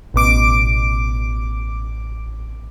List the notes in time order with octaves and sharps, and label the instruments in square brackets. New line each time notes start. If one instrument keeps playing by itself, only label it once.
[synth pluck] A1 B2 D6 D7